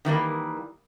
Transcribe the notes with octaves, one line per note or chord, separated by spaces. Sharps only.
D#3 E3 G3 A#3